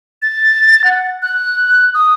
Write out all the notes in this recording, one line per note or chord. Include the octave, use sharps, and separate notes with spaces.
A6
F#5
F#6
D#6